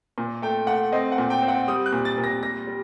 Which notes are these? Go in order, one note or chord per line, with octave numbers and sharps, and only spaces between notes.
A#2
A3 G5
A3 F#5
C4 D#5
F#5
A#2
G5
C4
F#5
G3 D#6
F#6
A#2
A6
A#2
A#6
G3 A#6
G3